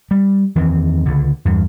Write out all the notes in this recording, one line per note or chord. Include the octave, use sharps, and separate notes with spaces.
G3
E2 D#3 E3 C4
C#2 D3
E2 G2